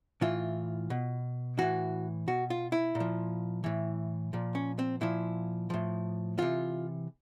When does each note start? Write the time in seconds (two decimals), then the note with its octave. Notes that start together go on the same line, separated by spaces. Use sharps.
0.22 A2 E3 F4
0.90 B2
1.58 A2 E3 F#4
2.28 B2 F#4
2.50 F4
2.72 E4
2.95 A#2
3.00 F3
3.64 A2 E3
4.33 A#2 F3
4.55 C#4
4.79 C4
5.01 A#2 F3 E4
5.70 A2 F3
6.38 C3 E3 F4